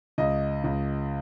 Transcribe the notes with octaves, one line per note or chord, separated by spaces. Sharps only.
C#2 D#5
C#2